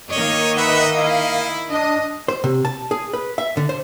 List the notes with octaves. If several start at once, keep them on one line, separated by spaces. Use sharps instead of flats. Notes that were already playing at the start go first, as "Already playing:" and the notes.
D#3 A#3 C#5 D#5
B4 E5 F#5 F#6
E4 F5
D4 D#5
C5
C3
A5
G#4
B4
E5
D3
C5